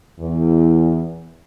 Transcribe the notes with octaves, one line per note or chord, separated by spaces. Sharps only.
E2